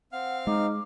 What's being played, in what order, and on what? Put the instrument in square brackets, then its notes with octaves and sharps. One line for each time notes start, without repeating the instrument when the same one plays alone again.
[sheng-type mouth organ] C4 F5 F6 [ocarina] F#5
[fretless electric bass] G#3 [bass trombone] D#4 [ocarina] D6